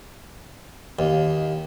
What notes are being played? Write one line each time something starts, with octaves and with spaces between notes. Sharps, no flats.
D#2